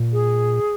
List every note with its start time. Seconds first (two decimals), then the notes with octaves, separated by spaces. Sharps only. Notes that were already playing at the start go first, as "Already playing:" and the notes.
Already playing: A#2
0.13 G#4